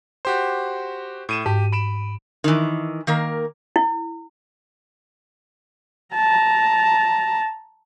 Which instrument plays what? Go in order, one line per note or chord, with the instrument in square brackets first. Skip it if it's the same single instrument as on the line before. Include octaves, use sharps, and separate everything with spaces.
[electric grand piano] F#4 G4 C5
A2 D#7 E7
[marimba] G#2 [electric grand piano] G4
[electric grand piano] B5 D7 E7
[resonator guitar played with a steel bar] D#3 E3
D#3 A#3 A#4
[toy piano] E4
[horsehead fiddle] A5 A#5